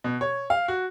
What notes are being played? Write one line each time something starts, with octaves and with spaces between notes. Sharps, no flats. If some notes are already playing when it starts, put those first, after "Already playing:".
B2
C#5
F5
F#4